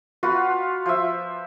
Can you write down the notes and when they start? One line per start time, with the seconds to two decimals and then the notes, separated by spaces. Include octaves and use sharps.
0.23 F4 F#4 B4 F#5
0.86 F3 E5